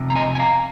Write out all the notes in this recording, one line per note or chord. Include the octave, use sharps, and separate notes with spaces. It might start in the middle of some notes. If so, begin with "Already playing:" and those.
Already playing: F2 C3
A#5
D#5 G#5
G#5
F5 A#5